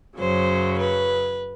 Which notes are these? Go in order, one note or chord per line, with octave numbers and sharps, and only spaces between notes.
F#2 C#3 F#3 C5
B4